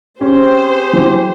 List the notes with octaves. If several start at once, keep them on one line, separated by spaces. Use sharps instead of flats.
C4 C#4 G4 G#4 C5
E3 F#3